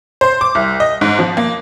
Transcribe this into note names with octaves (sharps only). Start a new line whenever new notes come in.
C5
D6
C2
D#5
G#2
F3
A#3